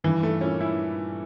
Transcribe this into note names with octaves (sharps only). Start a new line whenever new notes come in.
G2 E3
A3
A#2 C#4
E4